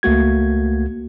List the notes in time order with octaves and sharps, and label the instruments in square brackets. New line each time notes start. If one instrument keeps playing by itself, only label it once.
[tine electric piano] C#2 A3 A#3 F#4 G#6